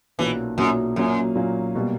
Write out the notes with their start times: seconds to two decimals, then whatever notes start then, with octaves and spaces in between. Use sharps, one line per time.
0.19 B1 A#2 E3 A#3 C#4 F#4
0.58 B1 F#2 A#2 A#3 C#4 F#4
0.96 F#2 A#2 F#3 A#3 C#4
1.35 A#2 F#3 A#3 C#4
1.75 B2 G3 A#3